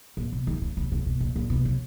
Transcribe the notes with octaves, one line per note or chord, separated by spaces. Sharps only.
A#2
B2
D#3
C#3
C#3
C#3
B2
A#2
A#2
B2
C#3